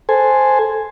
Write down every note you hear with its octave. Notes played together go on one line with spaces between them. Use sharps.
A4 C5 G#5